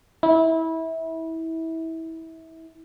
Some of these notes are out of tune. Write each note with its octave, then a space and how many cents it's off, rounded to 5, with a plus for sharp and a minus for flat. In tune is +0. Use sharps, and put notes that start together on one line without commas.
E4 -25